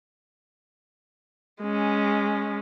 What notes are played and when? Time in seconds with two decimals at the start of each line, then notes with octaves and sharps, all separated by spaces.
1.62 G#3 C#4